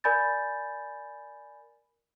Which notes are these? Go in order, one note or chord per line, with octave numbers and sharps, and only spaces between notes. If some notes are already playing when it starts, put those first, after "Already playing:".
A#4 D5 G#5 B5 G6 A6